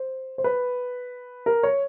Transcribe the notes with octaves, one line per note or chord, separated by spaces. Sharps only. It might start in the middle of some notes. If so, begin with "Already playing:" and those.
Already playing: C5
C5
B4
A#4
C#5